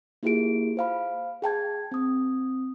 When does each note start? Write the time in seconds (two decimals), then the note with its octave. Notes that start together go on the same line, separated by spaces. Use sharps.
0.23 A#3 E4 F4 G4 G#4 D7
0.77 C5 F5 B5
1.42 G#4 G5 A5 G#6
1.92 C4 D#6